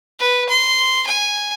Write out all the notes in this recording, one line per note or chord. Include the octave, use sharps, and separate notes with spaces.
B4
C6
G#5